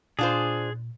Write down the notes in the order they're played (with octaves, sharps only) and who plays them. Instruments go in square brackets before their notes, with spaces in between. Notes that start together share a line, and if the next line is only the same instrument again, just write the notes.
[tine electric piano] A#2 [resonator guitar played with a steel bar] D4 F4 C5 [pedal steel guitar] G#4